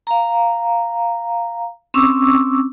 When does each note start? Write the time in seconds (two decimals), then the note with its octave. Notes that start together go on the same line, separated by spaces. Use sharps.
0.07 F5 A#5
1.94 C4 C#4 C#6 D6 E6